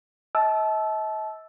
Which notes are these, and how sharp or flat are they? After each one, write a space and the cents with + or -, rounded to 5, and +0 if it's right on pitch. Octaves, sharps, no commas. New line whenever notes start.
D#5 +45 A5 -30 E6 +0